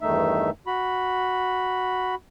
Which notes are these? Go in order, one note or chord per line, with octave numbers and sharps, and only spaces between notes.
E2 G2 D#3 A3 D#4 E5
F#4 B5